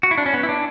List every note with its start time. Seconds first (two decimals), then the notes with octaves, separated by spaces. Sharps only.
0.03 F#4
0.11 E4
0.18 D4
0.26 C#4
0.34 B3
0.43 E4
0.49 D4